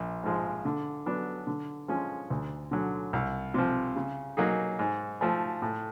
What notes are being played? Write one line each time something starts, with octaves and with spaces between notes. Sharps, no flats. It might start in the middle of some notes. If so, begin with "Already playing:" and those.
Already playing: A#1
G#2 F3 G#3
D3
F#3 B3 D4
D3
F3 G#3 C#4
D2
D3 F#3
C2
C3 F3
C#3
F#3 A#3 D#4 G#4
G#2
F3 A3
A2